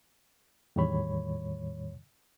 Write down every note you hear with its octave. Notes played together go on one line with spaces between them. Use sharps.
E2 A2 D#3 G3 C#5 B5